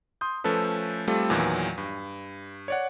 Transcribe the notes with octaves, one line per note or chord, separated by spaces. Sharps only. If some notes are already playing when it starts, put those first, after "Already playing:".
C6 D#6 G6
F3 A3 C#4 A4 B4
G3 A3 C4 F4 A4
E2 A#2 D#3 E3 F#3
G2
C#5 D5 F#5